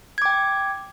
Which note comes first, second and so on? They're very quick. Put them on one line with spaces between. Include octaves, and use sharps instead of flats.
G#6 D6 G5